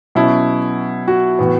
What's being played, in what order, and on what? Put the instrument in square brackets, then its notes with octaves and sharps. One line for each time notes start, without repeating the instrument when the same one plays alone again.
[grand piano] B2 F#3 C#4 E4
F#4
A2 E3 B3